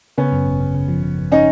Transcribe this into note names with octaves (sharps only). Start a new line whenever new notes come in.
C#3 B3 C#4
F#2
G#1
C#3
C#3
F3
C#3
G#1
C#4 D#4